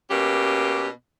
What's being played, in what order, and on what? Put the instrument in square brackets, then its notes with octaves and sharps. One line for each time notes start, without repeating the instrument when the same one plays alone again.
[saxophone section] B2 A#3 C#4 G4